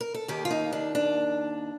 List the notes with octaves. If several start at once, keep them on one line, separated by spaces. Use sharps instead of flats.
A#4
A4
D#2 D#3 A#3 G4
F4
D#4
D4
D4